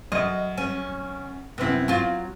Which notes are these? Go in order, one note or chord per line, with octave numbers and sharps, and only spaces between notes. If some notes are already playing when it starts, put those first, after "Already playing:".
F#2 D#5
C#4
F#2 C3 B3 C4 E4
F#3 F4